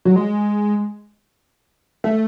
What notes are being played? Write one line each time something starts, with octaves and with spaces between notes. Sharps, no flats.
F#3
G#3
A3